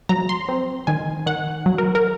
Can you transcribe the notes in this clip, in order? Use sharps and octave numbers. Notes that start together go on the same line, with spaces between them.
F#3 A#5
C6
C4
D#3 G#5
D#3 F#5
F#3
A#4
A#4